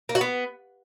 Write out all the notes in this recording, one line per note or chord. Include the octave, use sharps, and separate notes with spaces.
A#3
F#4
B3